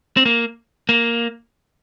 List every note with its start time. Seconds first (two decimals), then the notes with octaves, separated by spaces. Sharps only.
0.17 C4
0.26 A#3
0.89 A#3